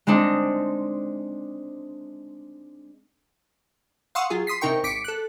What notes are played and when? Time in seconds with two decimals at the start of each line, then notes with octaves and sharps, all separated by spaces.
0.07 G#3 C4 D4 D#4
4.15 F5 F#5 C6 C#6 D#6 E6
4.30 F#3 F4 G#4
4.47 C6 D#6 B6 C7
4.61 C3 D#4 A#4 G5 C#6
4.84 G#1 D6 B6 C#7 D7
5.04 A4 F#6